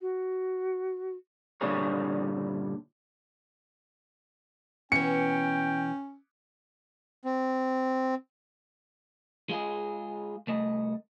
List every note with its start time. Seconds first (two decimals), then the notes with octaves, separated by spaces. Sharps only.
0.01 F#4
1.61 G2 A#2 D3 G3 G#4 C#5
4.92 B2 E3 C#4 G5 C#7
7.25 C4
9.49 G#3 F4 G#4
10.47 C2 A3 D#5